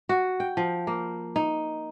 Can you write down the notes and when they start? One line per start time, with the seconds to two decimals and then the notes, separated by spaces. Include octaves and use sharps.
0.09 F#4
0.40 G5
0.57 F3
0.87 A#3
1.36 D#4